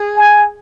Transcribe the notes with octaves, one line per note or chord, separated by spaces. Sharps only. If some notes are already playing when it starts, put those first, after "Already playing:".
Already playing: G#4
G#5